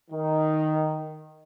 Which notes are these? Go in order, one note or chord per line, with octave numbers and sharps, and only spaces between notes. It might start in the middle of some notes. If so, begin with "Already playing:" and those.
D#3